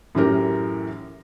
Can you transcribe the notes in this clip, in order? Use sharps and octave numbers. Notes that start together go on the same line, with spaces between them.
F#2 A2 E3 G4 A#4